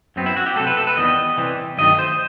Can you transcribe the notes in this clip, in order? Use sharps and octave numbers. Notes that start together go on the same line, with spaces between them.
F#2 F#3 B3 C4
E4
F#4
G4
C3 F#3 A3 A4
B4
A4
B4
E2 D#3 G3 B3 D#5
C3 E3 G3
G2 D#3 F#3 A3 D#5
C5